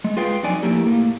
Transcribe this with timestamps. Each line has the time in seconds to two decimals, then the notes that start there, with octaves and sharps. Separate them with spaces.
0.04 G#3
0.17 F4 G#4 B4 F5 G5
0.43 F2 F#3 D#4 D5 G#5
0.63 A2 F3 A#3 E4 G4
0.87 A2 A#3